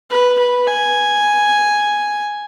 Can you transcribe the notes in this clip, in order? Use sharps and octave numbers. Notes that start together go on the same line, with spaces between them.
B4
B4
G#5